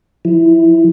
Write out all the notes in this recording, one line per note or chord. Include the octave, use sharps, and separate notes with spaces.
F3 E4